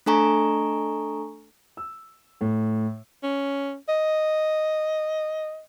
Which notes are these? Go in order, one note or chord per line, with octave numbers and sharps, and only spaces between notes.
A3 D4 A4 G#5 A#5 C#6
E6
A2
C#4
D#5